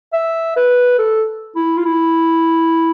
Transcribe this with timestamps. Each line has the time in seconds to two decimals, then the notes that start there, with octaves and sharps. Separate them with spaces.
0.13 E5
0.56 B4
0.99 A4
1.56 E4
1.77 F4
1.85 E4